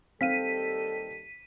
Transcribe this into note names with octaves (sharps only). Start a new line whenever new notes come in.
D#2 G3 C4 A4 F5 B6 D#7